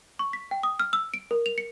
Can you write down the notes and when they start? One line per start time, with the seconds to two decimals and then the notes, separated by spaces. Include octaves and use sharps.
0.19 C#6
0.33 B6
0.51 G5
0.63 D#6
0.80 F6
0.93 E6
1.14 D7
1.31 A#4
1.46 F7
1.58 C#7